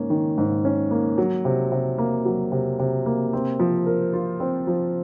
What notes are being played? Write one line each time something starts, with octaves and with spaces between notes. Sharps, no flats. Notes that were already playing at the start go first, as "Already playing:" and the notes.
Already playing: G#2 A#3 C#4
D#3
G#2
C#4
A#3
F#3
C3
C3
A#3
F#3
C3
C3
A#3
C4
F3
A#4
F4
C4
F3